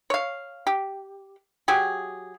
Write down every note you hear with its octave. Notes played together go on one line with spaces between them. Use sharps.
C#5 F5
G4
F#3 G4 G#4